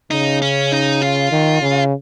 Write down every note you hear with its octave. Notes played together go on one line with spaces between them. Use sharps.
C#3 D#4
C#4
D#4
F4
D#3
C#3